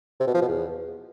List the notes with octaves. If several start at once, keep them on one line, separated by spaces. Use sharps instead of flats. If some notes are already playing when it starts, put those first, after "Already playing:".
C3
B2
F3
B2
E2